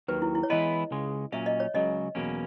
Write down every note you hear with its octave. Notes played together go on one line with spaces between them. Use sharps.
D#2 D#3 F#3 B4
E4
E4
C#5
E3 G#3 B3 E4 B4 D#5
C#2 C#3 G#3
A#2 F#3 C#4 E5
D#5
C#5
C#2 C#3 F#3 D#5
E2 B2 F#3 A#3 C#4